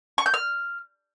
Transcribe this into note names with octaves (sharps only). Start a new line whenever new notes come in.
C#6
G6
F6